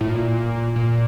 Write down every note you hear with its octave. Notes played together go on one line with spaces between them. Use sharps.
A2
A#2
A#2